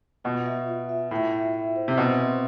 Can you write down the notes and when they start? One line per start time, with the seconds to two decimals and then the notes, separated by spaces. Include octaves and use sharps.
0.24 B2 F4
0.46 E5
0.68 F4
0.89 E5
1.11 A2 E5
1.33 E5
1.54 E5
1.76 C5
1.88 C3
1.97 B2 C4
2.19 C4